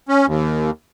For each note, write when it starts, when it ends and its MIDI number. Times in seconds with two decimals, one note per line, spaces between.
0.09 0.26 61
0.27 0.70 39